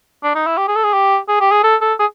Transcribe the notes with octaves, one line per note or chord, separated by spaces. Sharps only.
D4
D#4
E4
G4
G#4
A4
G#4
G4
G#4
G4
G#4
A4
A4
G#4